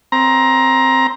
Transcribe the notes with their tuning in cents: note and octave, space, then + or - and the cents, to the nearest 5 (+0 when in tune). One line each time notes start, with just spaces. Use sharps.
C4 +0 A#5 +15